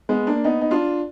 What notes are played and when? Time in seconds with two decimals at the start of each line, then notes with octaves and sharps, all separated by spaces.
0.09 G#3 B3
0.27 A#3 D4
0.44 B3 D#4
0.61 D#4
0.71 D4 F4